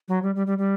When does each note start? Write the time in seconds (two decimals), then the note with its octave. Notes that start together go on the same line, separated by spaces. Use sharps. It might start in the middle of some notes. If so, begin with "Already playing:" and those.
0.08 F#3
0.23 G3
0.36 G3
0.47 G3
0.58 G3